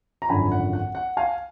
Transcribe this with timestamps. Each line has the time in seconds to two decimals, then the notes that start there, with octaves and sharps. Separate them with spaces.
0.22 A#5
0.29 G#1 F#2 D3 F3 G#5 B5
0.52 F#5
0.73 F#5
0.95 F#5
1.17 F5 G#5